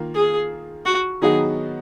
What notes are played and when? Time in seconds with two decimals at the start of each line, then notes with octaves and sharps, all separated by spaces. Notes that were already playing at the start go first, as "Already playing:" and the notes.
Already playing: D#3 A#3 F4
0.14 G#4
0.85 F#4
1.21 D#3 F#3 B3 D#4 F#4 G#4